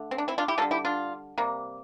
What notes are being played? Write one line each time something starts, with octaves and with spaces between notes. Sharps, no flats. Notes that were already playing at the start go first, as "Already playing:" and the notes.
Already playing: D3 A3
C4
D4
C4 E4
D4 F4
E4 G4
D3 G3 A#3 F4 A4
E4 G4
D4 F4
C3 G3 A#3